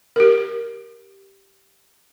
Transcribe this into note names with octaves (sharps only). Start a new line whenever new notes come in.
G4 A#4